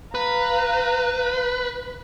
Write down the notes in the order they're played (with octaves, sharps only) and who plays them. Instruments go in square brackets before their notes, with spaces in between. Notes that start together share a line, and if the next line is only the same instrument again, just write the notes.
[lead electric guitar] B4 [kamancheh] F5 A#5